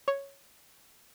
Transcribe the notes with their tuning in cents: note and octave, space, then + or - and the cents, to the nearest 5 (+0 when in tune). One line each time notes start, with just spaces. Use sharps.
C#5 +0